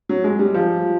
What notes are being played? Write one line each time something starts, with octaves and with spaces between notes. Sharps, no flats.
F#3
G#3
G3
F3